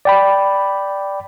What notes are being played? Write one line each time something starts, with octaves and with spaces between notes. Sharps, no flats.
D5 G5 B5